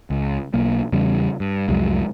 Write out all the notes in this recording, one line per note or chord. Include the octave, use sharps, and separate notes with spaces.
C#2
B1 A#3
E2 C#3 G3
G2
C2 F2 F#3 G#3